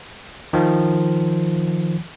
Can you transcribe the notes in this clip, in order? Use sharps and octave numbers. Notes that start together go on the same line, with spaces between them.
D#3 F3